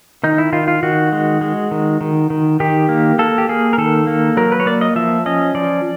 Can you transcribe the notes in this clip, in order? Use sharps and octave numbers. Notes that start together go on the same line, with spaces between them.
D#3 D#4
E4
D#3 F4
F4
D#3 F#4
G#3
G#3
D#3
D#3
D#3
D#3 G4
A#3
A#3 A4
G4
A#3 G#4
A#4
D#3 A4
A#3
F#3 A#4
B4
C#5
A#3 D5
D#5
F3 E5
C#4 D#5
F3 D5